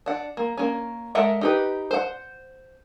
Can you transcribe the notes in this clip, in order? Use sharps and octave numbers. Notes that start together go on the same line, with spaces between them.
D4 F#5
A#3
A#3 C#4
G#3 A4 A#4 E5 F#5
D#4 G4 B4
C5 F#5